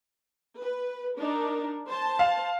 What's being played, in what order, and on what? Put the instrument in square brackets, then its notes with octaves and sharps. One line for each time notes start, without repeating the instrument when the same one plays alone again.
[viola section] B4
D4 D#4 A#4
C5 A5
[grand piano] F5